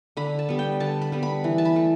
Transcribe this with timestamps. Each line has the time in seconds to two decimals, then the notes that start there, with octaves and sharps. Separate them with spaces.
0.17 D3 B5
0.39 A5
0.49 G3 B3
0.59 G5
0.80 D3 A5
1.01 B5
1.12 G3 B3
1.23 B5
1.44 E3
1.58 A5
1.65 B5
1.76 A3